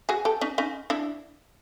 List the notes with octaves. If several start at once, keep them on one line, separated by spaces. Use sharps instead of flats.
F#4 G#4
G4 A4
C#4 D#4
C#4 D#4
D4 E4